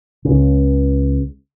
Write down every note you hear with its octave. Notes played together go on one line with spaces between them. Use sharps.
C#2 C#3